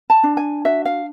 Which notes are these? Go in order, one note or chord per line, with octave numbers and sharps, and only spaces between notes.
A5
D4
G#5
F#4 E5
F5